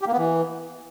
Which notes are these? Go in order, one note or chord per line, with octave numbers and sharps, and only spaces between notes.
G4
A#3
B3
E3